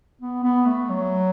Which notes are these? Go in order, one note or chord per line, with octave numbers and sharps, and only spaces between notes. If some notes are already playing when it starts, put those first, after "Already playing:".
B3
B3
A3
F#3